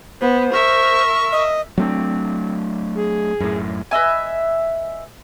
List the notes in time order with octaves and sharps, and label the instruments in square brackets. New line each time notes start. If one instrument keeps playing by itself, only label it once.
[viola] B3 [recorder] C5
[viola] A#4 E5 [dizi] C#6
[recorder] D#5
[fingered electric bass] F#3 A3 D4 [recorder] C4
[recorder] G#4
[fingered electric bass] F#2 A2
[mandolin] B4 D#5 E5 G#5